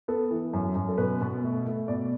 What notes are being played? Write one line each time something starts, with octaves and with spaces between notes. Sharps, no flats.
B3 A4
E3
F#2
F#2
A4
B2 B4
B2
A3
A3
B2 D5